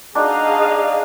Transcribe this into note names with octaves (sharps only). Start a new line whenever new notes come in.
D4 D#4 F#4 G#4 D#5 F5